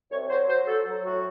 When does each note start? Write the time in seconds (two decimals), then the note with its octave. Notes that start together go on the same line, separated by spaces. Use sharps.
0.10 C2 C#5
0.29 F#3 C5
0.48 F#3 C5
0.66 F#3 A4
0.85 F#3
1.04 A2 F#4